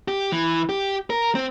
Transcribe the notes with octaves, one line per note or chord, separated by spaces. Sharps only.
G4
E3
G4
A#4
C4